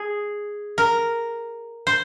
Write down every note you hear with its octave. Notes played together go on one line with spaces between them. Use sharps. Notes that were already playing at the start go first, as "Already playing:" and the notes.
Already playing: G#4
A#4
C5